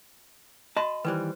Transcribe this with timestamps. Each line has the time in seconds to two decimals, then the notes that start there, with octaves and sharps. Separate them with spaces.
0.77 F#4 D#5 A5 C6
1.05 D#3 E3 G3 B4 C5